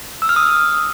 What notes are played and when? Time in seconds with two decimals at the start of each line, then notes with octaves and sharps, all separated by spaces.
0.22 E6
0.29 F6
0.36 D#6